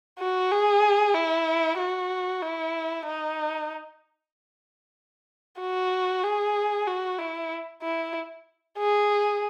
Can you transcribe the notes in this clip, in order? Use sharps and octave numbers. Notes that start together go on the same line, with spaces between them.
F#4
G#4
E4
F#4
E4
D#4
F#4
G#4
F#4
E4
E4
G#4